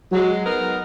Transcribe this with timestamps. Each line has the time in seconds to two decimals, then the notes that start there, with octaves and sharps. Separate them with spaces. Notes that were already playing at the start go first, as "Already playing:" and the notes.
0.12 F#3 G#3
0.45 B3 D#4 A#4